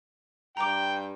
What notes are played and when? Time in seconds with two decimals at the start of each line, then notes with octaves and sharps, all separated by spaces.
0.57 G2 G5 A#5 D6